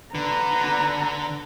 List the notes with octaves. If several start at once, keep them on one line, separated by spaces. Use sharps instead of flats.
D3 B4 A#5